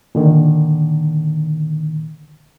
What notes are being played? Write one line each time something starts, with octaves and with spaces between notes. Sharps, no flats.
A#2 D3 D#3